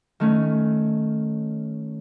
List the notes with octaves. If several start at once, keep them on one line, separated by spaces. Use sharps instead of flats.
D#3 A3 C#4